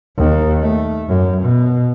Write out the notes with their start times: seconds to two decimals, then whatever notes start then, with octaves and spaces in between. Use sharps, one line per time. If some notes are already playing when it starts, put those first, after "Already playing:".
0.17 D#2
0.61 A3
1.08 F#2
1.43 B2